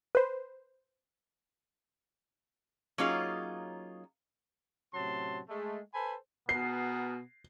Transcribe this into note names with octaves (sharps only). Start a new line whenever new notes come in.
B4 C5
F#3 A#3 C#4 D#4 F4 G#4
A2 C3 F#3 C#4 A5 C6
G#3 A3
A4 B4 C5 G#5 B5
B2 B3 G#4 A#4 C7